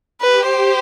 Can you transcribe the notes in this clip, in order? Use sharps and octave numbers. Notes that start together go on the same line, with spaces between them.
G4 B4
C5